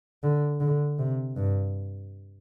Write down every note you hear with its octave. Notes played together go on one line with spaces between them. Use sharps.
D3
D3
C3
G2